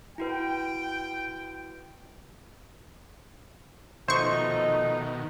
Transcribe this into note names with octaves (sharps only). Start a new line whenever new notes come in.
E4 F#4 B4 G5
B2 D#3 F3 A3 D#4 C5 C#6